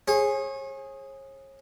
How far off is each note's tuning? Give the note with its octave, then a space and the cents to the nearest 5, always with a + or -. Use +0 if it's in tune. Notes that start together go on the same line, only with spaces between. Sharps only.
G#4 +0 C#5 -40